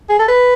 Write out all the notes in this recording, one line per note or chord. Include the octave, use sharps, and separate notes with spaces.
G#4
A4
B4